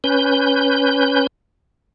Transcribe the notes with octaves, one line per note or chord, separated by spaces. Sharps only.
C#4 B4 G6